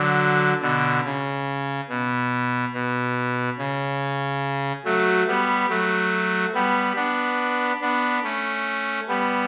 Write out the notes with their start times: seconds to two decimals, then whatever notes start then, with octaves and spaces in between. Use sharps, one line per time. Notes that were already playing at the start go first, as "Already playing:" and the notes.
Already playing: D3 F#3
0.61 B2 D3
1.04 C#3
1.89 B2
2.74 B2
3.58 C#3
4.85 F#3 A3
5.27 G3 B3
5.69 F#3 A3
6.54 G3 B3
6.96 B3 D4
7.81 B3 D4
8.24 A3 C#4
9.08 G3 B3